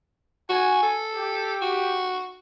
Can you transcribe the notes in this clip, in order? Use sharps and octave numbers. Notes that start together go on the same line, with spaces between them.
F#4 G#5
A4
G4
F#4